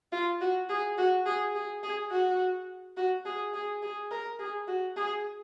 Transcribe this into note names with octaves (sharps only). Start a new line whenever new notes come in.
F4
F#4
G#4
F#4
G#4
G#4
G#4
F#4
F#4
G#4
G#4
G#4
A#4
G#4
F#4
G#4